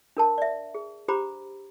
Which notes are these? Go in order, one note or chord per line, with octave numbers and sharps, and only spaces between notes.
D4 A#4 A5
D5 E5
G#4
D4 G4 C5 A#5 B5 D6